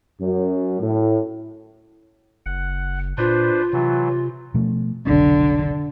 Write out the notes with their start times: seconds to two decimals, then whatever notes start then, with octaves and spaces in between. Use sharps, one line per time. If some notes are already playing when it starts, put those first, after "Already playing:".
0.20 F#2
0.80 A2
2.46 F#1 F#5
3.18 A#2 D4 F4 B4 C5
3.73 C3 E3 F#3
4.54 B2 F3 A3
5.07 F1 B1 D3 D4